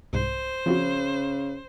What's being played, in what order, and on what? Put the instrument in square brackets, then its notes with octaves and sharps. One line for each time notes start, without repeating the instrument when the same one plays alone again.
[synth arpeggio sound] C2 G#2 [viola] C5
[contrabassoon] C#3 [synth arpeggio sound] F3 C4 F#4